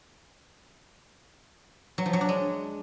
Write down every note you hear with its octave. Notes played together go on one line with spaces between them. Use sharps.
F#3
F3
F#3
D4
G#3